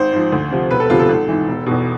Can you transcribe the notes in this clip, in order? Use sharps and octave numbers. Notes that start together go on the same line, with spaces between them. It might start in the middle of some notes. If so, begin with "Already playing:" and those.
Already playing: G#1 C5
G#2 F3
D2
C3 F3
E1 B4
A4
D2 C3 F3 F4
A4
G#1
G#2 E3
E1
E2 B2